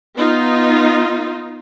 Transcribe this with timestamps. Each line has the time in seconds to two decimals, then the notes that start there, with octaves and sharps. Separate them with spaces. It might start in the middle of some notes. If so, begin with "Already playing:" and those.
0.16 B3 D#4 F4